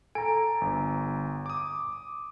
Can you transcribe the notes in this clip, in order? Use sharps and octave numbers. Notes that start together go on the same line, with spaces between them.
A4 G#5 A#5 D7
G1
D6 D#6